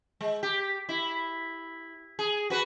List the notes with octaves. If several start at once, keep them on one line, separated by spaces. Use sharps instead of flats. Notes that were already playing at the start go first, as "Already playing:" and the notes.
G#3
G4
E4
G#4
F#4 B4